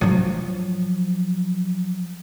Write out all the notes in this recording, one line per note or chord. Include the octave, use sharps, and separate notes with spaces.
F3 F#3